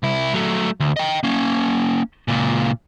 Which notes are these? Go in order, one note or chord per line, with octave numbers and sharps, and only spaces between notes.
C2 E4
F#3 A3
D2
D#5 G5
A#3 C#4
C#2 A#2